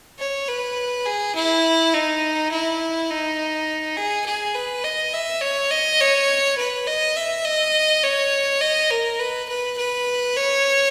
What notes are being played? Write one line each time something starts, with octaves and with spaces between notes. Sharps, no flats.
C#5
B4
G#4
E4
D#4
E4
D#4
G#4
G#4
B4
D#5
E5
C#5
D#5
C#5
B4
D#5
E5
D#5
C#5
D#5
A#4
B4
B4
B4
C#5